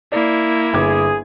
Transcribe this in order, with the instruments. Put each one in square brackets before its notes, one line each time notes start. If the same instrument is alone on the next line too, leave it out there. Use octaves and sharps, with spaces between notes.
[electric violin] A#3 E4 [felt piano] D5
[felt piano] G1 D6 G#6 [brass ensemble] G#4